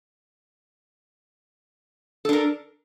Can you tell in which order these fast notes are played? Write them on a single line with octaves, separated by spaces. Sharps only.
A4 D4 A#4